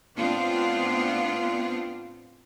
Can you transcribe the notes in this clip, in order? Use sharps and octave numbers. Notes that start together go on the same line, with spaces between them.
A2 B3 C4 D4 F4